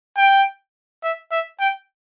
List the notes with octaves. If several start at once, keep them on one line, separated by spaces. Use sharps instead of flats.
G5
E5
E5
G5